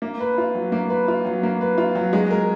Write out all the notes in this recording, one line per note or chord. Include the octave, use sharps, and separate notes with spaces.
A#3
B4
F4
F#3
A#3
B4
F4
F#3
A#3
B4
F4
F#3
G#3
A#4